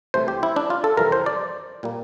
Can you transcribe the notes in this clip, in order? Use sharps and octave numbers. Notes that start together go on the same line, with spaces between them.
C2 C3 E3 A3 C5
G4
E4
D4
F4
A4
F2 C3 E3 G3 A#4
C5
D5
A#2 G3 A#3